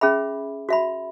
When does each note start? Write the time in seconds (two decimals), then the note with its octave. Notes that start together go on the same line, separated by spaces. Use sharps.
0.01 C#4 G#4 E5 B5
0.69 F#4 E5 B5